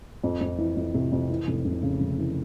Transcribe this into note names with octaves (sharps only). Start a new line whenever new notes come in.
F2
F2
E3
F2
C3
F2
E3
F1
F1
C#3
F1
E3